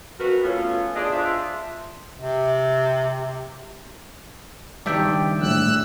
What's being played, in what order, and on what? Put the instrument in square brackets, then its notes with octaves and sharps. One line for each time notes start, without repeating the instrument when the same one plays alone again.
[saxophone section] F2 F#4 A#4 B4
A3 B3 C#4 F4
D4 F4 G#4 D5 D#5
D4 F4 C5 E5
[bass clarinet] C3
[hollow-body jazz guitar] G2 D#3 [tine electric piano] D5 E5 G5
[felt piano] A#1 A2 [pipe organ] E6 F#6